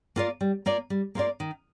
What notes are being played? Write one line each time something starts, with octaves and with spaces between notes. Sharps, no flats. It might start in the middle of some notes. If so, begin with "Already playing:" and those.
A#3 F4 A#4 D5
G3
A#3 F4 A#4 D5
G3
A#3 F4 A#4 D5
D#3